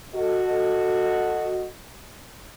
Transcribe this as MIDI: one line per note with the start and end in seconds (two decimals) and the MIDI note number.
0.16 1.67 66
0.16 1.67 69
0.16 1.67 75